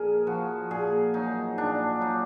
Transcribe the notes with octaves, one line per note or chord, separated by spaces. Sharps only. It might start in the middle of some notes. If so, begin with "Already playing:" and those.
Already playing: A#2 F3 G#4 A#4
F3 F#4
A#2 G#4
F#3 D#4
A#2 D4
F#3 D#4